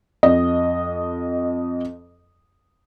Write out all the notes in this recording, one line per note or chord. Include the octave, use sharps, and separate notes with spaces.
F2 D#5